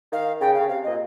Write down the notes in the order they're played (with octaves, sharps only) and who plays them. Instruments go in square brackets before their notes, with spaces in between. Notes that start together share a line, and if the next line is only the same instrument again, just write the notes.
[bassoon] D#3 [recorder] F5
[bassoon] C#3 [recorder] G5
[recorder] F5
[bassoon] C#3
[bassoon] C3 [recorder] F5
[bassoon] A#2 [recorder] D#5